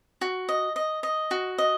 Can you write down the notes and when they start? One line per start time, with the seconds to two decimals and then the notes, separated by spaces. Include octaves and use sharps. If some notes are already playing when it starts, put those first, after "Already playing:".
0.21 F#4
0.49 D#5
0.76 D#5
1.03 D#5
1.31 F#4
1.58 D#5